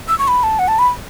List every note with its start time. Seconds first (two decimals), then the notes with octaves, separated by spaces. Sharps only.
0.08 E6
0.19 C#6
0.28 B5
0.43 A5
0.59 F#5
0.68 A5
0.79 B5